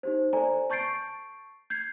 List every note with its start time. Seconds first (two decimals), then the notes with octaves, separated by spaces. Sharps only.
0.03 D#4 G4 C5
0.33 A4 C5 D5 G#5 A#5
0.70 A5 C#6 G6 A6 C7 D7
1.70 G6 G#6 C7